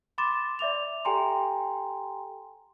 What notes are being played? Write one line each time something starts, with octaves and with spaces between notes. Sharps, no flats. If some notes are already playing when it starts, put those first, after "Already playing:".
B5 C6 D6 A6 E7
D5 E5 D6 F7
G4 A4 G5 G#5 A#5 C6